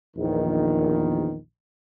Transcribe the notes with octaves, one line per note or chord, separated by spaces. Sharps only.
A#1 E2 D#3